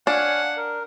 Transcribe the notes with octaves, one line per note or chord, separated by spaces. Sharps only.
D4 C#5 F5 F#5 G#5
A#4